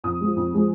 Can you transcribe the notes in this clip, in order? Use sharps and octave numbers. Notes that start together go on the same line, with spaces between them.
F2 D#6
F3 G#3
F2
F3 G#3